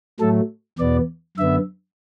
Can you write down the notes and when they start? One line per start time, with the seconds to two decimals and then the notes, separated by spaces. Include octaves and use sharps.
0.20 A2 F#3 A3 A4
0.79 E2 B2 B3 D5
1.37 F#2 D3 B3 E5